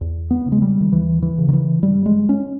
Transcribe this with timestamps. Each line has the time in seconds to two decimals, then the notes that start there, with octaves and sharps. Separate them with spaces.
0.01 E2
0.31 B3
0.46 C#3
0.52 G#3
0.62 G3
0.81 D#3
0.91 D#2 E3
1.22 E3
1.38 C#3
1.49 D#3
1.53 E3
1.83 G2 G3
2.06 G#3
2.29 C#4